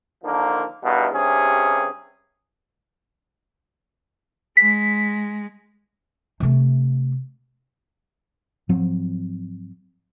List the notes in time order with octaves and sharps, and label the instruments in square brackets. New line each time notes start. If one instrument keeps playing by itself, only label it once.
[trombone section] D3 D#3 F3 A#3
E2 G2 B2 D#3
G2 C3 C#4 G#4
[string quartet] G#3 [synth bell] B6
[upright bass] C3 A3
[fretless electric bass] G#2 F3 F#3 C4